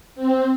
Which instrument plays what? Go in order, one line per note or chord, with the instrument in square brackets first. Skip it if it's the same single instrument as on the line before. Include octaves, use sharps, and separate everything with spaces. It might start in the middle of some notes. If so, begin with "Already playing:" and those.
[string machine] C4